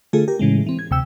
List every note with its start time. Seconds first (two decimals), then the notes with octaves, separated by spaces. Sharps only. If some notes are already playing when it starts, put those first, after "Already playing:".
0.13 D3 A3 F4 G#4 A4
0.28 G4 A#4
0.39 A2 C#3 E3 G#3
0.66 E3 C4
0.79 G#6
0.91 D2 C3 G5 E6